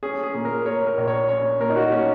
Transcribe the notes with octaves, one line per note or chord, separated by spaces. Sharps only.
C#4 G#4
G#4
A#2
A#4
A#3 C#5
A#4
A#1
C#5
C#4 C#5
A#2 A#4
D#4
F#4
A#3 C#4